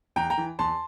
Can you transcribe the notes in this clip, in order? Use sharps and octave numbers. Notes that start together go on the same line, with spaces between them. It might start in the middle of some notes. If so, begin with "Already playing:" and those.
E2 G5 A#5
G5 A#5
E3
E2 A5 C6